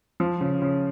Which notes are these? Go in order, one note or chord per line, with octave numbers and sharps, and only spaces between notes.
F3
C#3
C#3